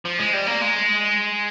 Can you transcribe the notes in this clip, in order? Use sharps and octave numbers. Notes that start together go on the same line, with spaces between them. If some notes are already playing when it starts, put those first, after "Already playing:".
F3
G#3
G3
A#3
G#3